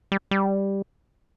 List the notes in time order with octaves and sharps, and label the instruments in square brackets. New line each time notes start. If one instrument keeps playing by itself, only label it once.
[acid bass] G3
G3